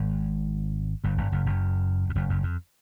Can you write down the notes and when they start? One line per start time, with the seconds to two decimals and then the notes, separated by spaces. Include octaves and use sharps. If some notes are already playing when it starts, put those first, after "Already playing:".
Already playing: G#1 G#2
1.04 G1 G2
1.17 G1 G2
1.32 F#1 F#2
1.46 F#1 F#2
2.09 F2
2.15 F#1 F#2
2.29 F#1 F#2
2.43 F2